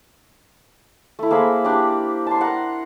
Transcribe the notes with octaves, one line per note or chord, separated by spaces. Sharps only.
A3 E4
A#3 G#4 C5 B5
D4 G4 D5
A5 C6
A#4 F#5